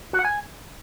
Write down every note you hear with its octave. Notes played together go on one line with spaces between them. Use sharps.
F#4
F#5
G#5